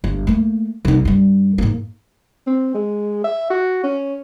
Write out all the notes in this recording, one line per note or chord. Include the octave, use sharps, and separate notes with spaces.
G1
A3 A#3
C2 D#4
G2 G3
G#2 A#3
C4
G#3
E5
F#4
C#4